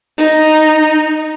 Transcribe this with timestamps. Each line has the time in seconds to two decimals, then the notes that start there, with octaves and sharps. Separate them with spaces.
0.18 D#4